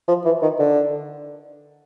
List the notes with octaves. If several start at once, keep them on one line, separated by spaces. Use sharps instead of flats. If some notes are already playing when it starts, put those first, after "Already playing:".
F3
E3
D#3
D3